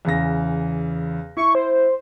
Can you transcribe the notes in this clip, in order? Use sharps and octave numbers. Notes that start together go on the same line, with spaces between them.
E2 C#3 A#6
E4 C#6
C5